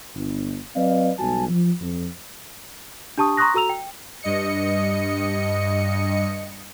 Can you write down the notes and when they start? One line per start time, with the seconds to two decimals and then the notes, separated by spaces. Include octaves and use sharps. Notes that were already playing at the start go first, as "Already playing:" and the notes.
0.15 G1
0.76 F#3 C4 B4 D5 D#5 F5
1.18 B1 F#3 G3 F#4 G#5 A5
1.49 F3
1.81 F2
3.18 D4 G4 A5 C#6 D#6
3.37 A#5 C6 C#6 D#6 F#6 A#6
3.54 F#4 A4 A#5 E6 F7
3.69 G5
4.22 G2 D#5 C#7